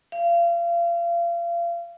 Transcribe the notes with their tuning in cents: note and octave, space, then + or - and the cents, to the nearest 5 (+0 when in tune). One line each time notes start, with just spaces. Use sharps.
F5 -35